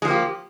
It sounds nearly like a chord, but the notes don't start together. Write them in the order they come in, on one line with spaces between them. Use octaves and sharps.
G#3 F3 A#3 G4